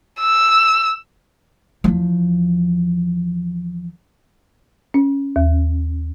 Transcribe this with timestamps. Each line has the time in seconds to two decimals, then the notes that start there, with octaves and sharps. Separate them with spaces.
0.20 E6
1.84 E2 F3
4.94 C#4
5.36 D#2